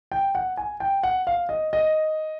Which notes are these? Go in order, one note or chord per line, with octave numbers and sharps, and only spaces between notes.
G5
F#5
G#5
G5
F#5
F5
D#5
D#5